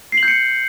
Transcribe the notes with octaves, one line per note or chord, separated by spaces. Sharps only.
C7
F#7
G6
C#7